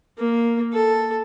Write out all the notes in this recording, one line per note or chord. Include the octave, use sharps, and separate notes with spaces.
A#3
A4